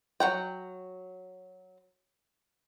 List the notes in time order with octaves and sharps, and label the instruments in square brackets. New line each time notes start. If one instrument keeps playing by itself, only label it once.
[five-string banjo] F#3 F#5 G5